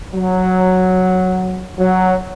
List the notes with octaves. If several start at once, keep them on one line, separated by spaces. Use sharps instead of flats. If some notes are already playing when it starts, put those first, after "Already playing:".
F#3
F#3